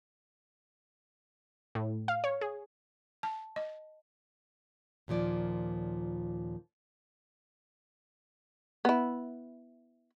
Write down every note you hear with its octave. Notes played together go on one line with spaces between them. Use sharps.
A2
F5
C#5
G#4
A5
D#5
D#2 A#2 F3 D5
B3 E4